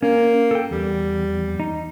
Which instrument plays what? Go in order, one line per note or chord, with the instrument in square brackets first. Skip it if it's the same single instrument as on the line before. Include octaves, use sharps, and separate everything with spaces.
[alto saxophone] A#3 [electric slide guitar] C#4
[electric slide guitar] A4 G5
[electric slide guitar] E2 [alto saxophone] G3
[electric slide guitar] D#4